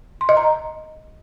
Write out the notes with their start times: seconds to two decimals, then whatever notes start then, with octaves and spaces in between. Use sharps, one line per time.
0.21 C6
0.29 D#5
0.37 A#5